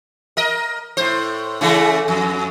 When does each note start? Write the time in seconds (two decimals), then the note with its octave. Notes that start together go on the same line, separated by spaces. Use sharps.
0.37 A#4 D#5
0.97 A2 C5
1.61 C#3 E3 A3
2.08 F2